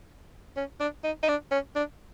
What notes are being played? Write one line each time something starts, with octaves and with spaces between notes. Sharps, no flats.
C#4
D4
D#4
D#4
D4
C#4
D4